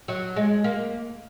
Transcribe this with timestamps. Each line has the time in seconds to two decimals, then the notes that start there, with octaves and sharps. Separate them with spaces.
0.08 F#3
0.36 G#3
0.64 A#3